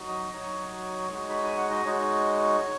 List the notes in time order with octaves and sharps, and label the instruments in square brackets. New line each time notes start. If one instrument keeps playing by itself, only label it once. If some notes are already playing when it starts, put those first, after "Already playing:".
Already playing: [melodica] F#3 D#4 F#4
D#5
F#3 D#4 F#4 C#5
G#3 D#4 F#4
B5
G#5
F#5
D#5
G#3 D#4 F#4 C#5